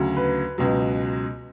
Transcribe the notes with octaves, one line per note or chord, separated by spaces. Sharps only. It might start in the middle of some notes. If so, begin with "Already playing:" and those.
Already playing: D2 C#3 F#3
B4
C#2 B2 F#3